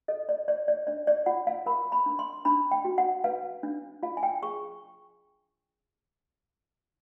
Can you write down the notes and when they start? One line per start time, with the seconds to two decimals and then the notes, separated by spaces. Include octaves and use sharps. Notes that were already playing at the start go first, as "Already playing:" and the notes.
0.08 A4 D#5
0.29 D5
0.48 C#5 D5
0.68 D5
0.87 D4 D5
1.07 D5
1.26 F4 F#5
1.47 F5
1.66 A#4 B5
1.92 B5
2.06 D4
2.19 C6
2.45 D4 B5
2.71 G5
2.85 F#4
2.98 F#5
3.24 B4 F5
3.63 D4
4.03 F4 F5
4.17 G#5
4.23 G5
4.42 G#4 C#6